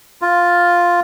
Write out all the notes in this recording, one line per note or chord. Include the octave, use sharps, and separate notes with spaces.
F4